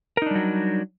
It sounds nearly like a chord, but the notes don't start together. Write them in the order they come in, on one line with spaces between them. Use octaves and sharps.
A#4 D#4 D4 G3 F#3